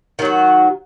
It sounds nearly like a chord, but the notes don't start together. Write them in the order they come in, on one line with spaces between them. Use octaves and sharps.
D#3 F#3 F#4